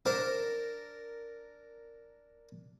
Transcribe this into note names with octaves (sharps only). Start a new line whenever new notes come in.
D4 A#4 C5